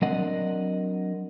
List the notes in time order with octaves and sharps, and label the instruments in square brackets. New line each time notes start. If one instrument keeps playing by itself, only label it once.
[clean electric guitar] F#3 C4 D4 A#4 D#5 F#5